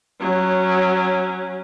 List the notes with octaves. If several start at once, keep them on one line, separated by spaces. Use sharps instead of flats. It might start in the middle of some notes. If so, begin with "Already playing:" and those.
F#3 C#4